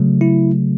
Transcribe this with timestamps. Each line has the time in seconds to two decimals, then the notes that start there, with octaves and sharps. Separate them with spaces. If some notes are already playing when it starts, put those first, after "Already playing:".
Already playing: C#3 F#3 A3
0.21 E4